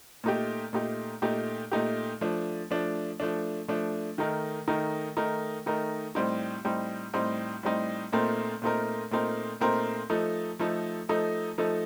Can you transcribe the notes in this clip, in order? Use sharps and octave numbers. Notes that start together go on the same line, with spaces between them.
A#2 A3 D#4 G4
A#2 A3 D#4 G4
A#2 A3 D#4 G4
A#2 A3 D#4 G4
F3 A3 D4
F3 A3 D4
F3 A3 D4
F3 A3 D4
D#3 A3 D#4 A#4
D#3 A3 D#4 A#4
D#3 A3 D#4 A#4
D#3 A3 D#4 A#4
A2 G3 C4 D#4
A2 G3 C4 D#4
A2 G3 C4 D#4
A2 G3 C4 D#4
A#2 A3 C4 D#4 A#4
A#2 A3 C4 D#4 A#4
A#2 A3 C4 D#4 A#4
A#2 A3 C4 D#4 A#4
F3 A3 D#4 A4
F3 A3 D#4 A4
F3 A3 D#4 A4
F3 A3 D#4 A4